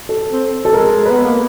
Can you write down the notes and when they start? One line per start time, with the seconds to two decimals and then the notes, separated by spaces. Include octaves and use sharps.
0.09 A4
0.31 C4
0.65 A4
0.73 G#3 A#4
1.06 B3 B4
1.24 A#3